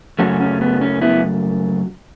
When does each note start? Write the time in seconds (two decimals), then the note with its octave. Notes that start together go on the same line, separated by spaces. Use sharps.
0.19 F#2 C#3 F#3 A3 C#4 F#4
0.41 C#4
0.61 B3
0.81 C#4
1.01 B3 E4